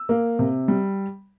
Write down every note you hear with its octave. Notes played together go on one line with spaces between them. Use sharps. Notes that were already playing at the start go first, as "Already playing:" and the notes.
Already playing: E6
A#3
C3
G3